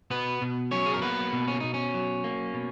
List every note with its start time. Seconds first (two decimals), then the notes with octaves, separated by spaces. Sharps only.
0.10 B2 B3 B4
0.42 B2
0.71 F#3 C#4 C#5
0.86 G#4
0.94 A#4
1.02 A#3 B3 B4
1.33 B2
1.48 C#4
1.60 B2 D#4
1.74 C#4
1.94 F#3
2.24 A#3
2.54 B2